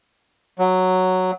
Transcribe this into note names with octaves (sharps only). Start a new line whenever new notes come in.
F#3